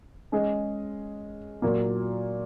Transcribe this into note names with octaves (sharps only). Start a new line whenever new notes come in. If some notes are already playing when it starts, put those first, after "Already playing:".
G#3 C#4 G#4 D#5
A#2 F#3 A#3